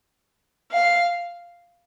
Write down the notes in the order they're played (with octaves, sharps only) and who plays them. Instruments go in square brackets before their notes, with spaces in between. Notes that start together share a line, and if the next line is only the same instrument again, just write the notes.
[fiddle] F5